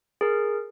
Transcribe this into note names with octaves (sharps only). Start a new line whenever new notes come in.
G#4 A#4